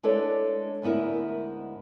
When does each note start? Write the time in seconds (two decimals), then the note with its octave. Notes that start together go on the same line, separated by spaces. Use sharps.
0.03 G#3 D4 E4 A4 B4 C#5
0.82 D2 G#2 B3 E4 A#4